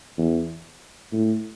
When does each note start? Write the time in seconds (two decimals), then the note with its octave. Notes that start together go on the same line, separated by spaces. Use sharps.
0.18 E2
1.13 A2